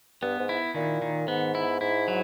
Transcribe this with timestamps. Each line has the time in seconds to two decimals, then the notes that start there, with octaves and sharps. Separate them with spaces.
0.22 G2 B3
0.39 G#2
0.49 E4
0.75 A#2 D#3
1.02 D#3
1.28 G#2 B3
1.55 E4
1.81 G#2 E4
2.08 F#3